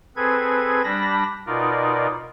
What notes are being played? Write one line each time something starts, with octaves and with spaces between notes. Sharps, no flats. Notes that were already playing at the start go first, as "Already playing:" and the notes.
C4 G#4 A4 B4 G#6
G3 D4 A5 B5 A#6
B2 D#4 F4 A#4 D5